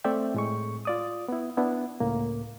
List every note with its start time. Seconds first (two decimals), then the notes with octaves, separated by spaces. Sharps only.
0.04 A3 C4 A4 D5 E5 G5
0.34 A2 G#3 C#6
0.85 F4 D5 D#6
1.28 B3 E4
1.57 B3 D4 E4
2.00 C#2 A2 A#3